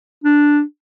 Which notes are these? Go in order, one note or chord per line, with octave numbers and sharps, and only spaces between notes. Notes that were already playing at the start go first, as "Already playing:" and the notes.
D4